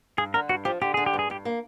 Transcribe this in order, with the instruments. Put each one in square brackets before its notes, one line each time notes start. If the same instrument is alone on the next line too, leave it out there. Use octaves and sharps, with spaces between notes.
[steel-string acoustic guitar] G2 [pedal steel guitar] G#4
[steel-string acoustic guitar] D3 [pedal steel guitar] A#4
[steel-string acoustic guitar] G2 [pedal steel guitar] F#4
[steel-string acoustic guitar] F3 [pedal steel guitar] G4
[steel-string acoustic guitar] D3 [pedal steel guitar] G4
[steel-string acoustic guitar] D3 [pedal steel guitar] G#4
[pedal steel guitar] G4
[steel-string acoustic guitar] G2
[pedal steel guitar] G#4
[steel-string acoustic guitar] G2 [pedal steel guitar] G4
[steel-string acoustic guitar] A#3